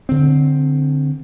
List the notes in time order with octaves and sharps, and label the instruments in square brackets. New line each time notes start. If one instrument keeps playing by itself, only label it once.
[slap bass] D3 C4